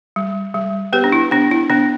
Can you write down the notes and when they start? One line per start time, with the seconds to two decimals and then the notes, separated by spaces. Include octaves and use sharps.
0.16 G3
0.54 G3
0.93 B3 G4 B4
1.04 D4
1.12 E4
1.31 B3 D4
1.51 E4
1.70 B3 D4